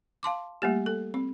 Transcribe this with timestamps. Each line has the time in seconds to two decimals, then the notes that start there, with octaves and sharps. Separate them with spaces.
0.23 F5 A5 C6 D6
0.62 G3 A3 A#3 G4
0.86 A4
1.14 C4